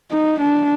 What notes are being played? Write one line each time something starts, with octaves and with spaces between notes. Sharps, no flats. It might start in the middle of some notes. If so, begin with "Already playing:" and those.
D#4
D4